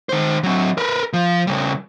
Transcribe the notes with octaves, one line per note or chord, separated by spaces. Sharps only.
D#3 C5
F#3 C4
A#4 B4
F3
C#3 G3